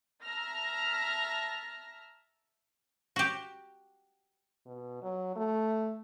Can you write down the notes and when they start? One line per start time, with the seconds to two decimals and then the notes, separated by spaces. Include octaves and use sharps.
0.22 E5 A5 A#5 F6 A#6
3.16 F#4 G4
4.66 B2
5.02 F#3
5.36 A3